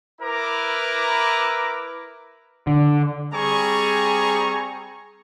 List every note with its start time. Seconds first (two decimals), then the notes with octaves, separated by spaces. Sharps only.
0.21 E4 A#4 B4 A#5 D6
2.67 D3
3.32 G3 C4 G#4 G#5 A#5 C#6